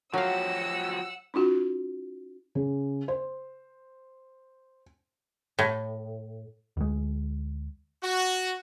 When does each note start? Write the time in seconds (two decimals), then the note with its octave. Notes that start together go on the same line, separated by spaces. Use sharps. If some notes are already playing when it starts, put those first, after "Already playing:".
0.14 F3 F#3 F#4 G4 F5 F#5 E6
1.34 C#4 D#4 F4 F#4
2.55 C#3
3.08 C5
5.59 A2
6.77 D2 G#3
8.04 F#4